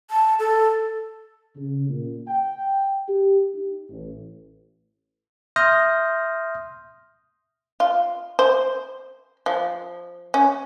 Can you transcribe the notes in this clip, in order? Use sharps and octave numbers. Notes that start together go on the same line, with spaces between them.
A5
A4
C#3
A#2
G5
G4
D#4
A1
E5 C6 D#6 F6 G6 A#6
F4
C5
F3
C#4